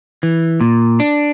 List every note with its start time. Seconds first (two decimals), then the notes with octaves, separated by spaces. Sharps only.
0.23 E3
0.61 A#2
1.00 D4